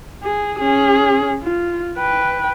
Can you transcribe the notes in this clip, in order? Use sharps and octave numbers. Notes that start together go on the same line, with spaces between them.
G#4
C#4 G#4
F4
B4 G5